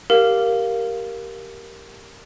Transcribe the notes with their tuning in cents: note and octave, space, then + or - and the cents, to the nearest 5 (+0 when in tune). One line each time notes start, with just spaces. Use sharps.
G4 +0 A#4 +0 F5 +0